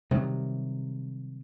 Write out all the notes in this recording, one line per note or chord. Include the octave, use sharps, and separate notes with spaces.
C3 D#3 F#3 G3